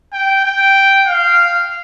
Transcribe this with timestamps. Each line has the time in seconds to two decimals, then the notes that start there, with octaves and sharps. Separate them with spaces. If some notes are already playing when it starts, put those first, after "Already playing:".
0.13 G5
0.44 G5
1.07 F5